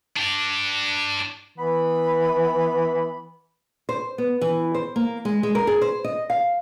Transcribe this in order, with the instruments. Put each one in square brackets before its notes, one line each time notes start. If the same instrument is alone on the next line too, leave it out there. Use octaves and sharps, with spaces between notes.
[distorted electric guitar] D4 G4
[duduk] E3 [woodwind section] B3 B5
[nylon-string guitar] C5
B3
E3
C5
A#3
G#3
G#3
A#4
G#4
C5
D#5
F5